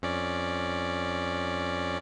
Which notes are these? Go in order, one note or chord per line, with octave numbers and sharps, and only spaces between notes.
F2 C#4 D5